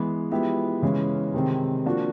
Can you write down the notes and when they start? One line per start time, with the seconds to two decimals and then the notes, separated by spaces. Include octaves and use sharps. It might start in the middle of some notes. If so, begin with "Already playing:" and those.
Already playing: E3 G#3 B3
0.31 F3 G#3 B3 E4 G4
0.82 C#3 E3 G#3 C#4
1.33 C3 D#3 G#3 C4
1.86 F3 A#3 D4 F#4